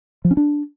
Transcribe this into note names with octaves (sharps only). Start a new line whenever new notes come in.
F3
C#4
D4